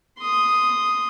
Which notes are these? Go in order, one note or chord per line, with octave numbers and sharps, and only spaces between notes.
C6 D#6